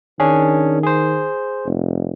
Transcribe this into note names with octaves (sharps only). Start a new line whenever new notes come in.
D#3 C#4 D4 G#4
G#4 C5
F1